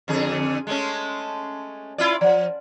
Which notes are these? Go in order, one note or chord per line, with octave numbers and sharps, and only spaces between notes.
F2 D3 G#4
G#3 A3 C#4
E4 F4 D5
F3 D5 F#5